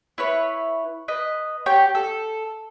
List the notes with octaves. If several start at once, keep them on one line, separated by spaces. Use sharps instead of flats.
E4 B4 C#5
B4 D#5
G4 C#5
A4